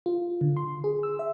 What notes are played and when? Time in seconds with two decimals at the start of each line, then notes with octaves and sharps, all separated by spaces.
0.06 F4
0.41 D3
0.57 C6
0.84 G#4
1.03 E6
1.19 E5